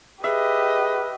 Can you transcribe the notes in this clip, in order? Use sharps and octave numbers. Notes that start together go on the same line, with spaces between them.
G4 G#4 B4 D#5 E5